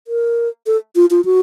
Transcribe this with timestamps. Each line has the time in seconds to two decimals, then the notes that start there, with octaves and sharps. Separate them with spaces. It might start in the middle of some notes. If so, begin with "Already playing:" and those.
0.08 A#4
0.67 A4
0.96 F4
1.11 F4
1.25 F#4